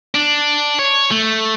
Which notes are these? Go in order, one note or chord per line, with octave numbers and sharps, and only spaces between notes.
D4
C#5
A3